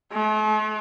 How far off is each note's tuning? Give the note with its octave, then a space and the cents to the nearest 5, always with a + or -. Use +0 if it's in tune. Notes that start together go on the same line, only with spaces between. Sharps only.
A3 -45